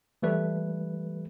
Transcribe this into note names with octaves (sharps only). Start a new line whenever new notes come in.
E3 G3 A3 B4